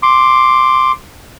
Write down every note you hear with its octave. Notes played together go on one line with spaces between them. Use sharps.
C6 D6